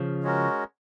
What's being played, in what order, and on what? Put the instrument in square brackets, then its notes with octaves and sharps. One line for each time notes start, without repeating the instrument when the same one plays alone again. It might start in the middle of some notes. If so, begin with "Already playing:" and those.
Already playing: [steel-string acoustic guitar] C#3 F3
[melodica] G#3 C#4 F#4 A#4